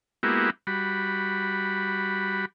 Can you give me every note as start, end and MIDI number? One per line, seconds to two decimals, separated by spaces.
0.23 0.50 56
0.23 0.50 58
0.23 0.50 59
0.23 0.50 64
0.23 0.50 66
0.23 0.50 67
0.67 2.45 55
0.67 2.45 66
0.67 2.45 83